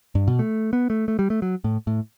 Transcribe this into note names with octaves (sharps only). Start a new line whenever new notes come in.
G2
B2
A3
B3
A3
A3
G3
A3
F#3
A2
A2